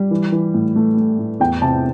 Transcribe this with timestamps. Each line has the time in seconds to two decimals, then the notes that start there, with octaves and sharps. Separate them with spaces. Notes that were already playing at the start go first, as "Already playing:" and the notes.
Already playing: G3
0.11 E3
0.32 E3
0.54 A2
0.76 A3
0.97 A3
1.19 A2
1.40 E2 G5
1.62 C3 A5